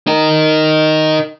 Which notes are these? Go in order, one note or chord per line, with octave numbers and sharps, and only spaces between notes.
D#4 A#4